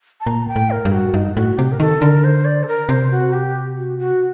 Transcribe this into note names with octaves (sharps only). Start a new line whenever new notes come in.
A5
A#2 A#5
G5
A2
A#4
G2
F#4
G2 D#4
A2 F#4
C3 G4
A#4
D#3 A4
D3 A#4
C5
D5
A4
A#4
C3 C5
F#4
G4
F#4
F#4